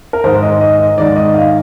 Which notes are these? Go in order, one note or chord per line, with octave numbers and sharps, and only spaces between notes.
A#4
G#2 D#3 G#3 C5
D#5
D#5
D#5
G#2 D#3 G#3 D5
D#5
F5